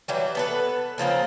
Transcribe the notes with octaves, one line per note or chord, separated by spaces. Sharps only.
E3 F#3 G3
B3 A4 B4
C#3 F3 A#3 C4